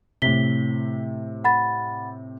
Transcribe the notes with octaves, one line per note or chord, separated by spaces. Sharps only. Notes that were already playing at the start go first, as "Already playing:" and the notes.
A2 C3 B6 G7
F#5 B5 A6